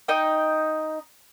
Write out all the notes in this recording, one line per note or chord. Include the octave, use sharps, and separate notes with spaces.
D#4 D#5 G5